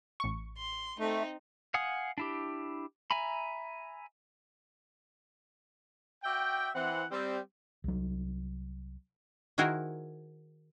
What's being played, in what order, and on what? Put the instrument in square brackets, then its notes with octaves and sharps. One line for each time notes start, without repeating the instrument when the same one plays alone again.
[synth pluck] A1 C#6
[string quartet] C6
[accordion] A3 [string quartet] C4 D#4
[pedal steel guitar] F5 F#5 G#5 D#6
D4 E4 G4
E5 G#5 A#5 B5
[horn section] F#4 D5 E5 G5
E3 C4 F#5
G3 C4
[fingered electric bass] C2 F#3
[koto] D#3 E4 F#4 G#4 A#4 C5